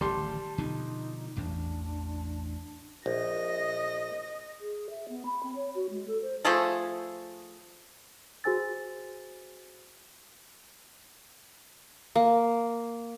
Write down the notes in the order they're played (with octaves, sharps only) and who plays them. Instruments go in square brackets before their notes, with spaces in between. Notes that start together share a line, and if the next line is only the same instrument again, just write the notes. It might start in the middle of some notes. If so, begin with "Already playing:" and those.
[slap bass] D1 A1 D#3 [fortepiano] G3 C6 [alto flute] A5
[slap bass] B2 D3 F3 [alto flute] D#4
[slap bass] A1 E2 [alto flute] D4
[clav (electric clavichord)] A#1 [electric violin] D#5 A#6
[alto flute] G#4
E5
B3
B5
C4
C#5
F#4
G#3
A4
C5
[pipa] F3 A3 G#4 A4
[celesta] F#4 G#4 C5 G#5 E6 A6
[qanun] A#3